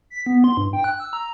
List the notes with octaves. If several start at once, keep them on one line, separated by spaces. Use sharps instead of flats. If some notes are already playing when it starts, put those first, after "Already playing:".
B6
B3
C6
G2
G5
F#6
E6
A#5